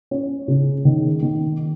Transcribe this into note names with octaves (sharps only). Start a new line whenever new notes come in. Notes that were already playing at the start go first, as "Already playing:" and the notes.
C#4
C#3
D#3
D#3